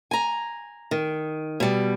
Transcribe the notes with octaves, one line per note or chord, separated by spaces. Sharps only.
G#5 A#5
D#3
B2 G3